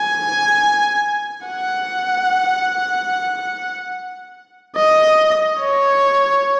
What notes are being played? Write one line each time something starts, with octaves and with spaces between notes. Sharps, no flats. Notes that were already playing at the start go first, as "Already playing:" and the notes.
Already playing: G#5
F#5
D#5
C#5